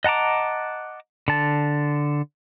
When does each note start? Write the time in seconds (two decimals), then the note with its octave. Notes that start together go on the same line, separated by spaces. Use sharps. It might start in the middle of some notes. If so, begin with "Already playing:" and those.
0.04 D#5 F#5 A5 A#5 D6
1.28 D3 A5